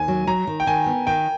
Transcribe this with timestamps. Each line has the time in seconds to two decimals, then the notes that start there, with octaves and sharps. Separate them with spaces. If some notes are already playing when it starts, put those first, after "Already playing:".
Already playing: D#2 G#5
0.08 F#3
0.27 F#3 A#5
0.47 D#3
0.60 G5
0.67 D#3 G#5
0.86 B3
1.07 D#3 G5